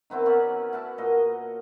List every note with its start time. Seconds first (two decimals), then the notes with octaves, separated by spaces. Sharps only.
0.10 D#3 B3 C4 E4
0.26 C#4 F#4 D5
0.73 E4 F#5 A5 B5
0.98 A#2 D#5 F#5